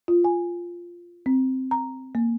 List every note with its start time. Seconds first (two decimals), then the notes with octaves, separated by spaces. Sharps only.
0.08 F4
0.24 G#5
1.26 C4
1.71 A#5
2.15 A#3